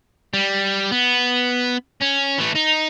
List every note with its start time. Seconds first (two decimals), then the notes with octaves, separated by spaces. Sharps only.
0.34 G3
0.92 B3
2.01 C#4
2.38 E3 A3
2.55 D#4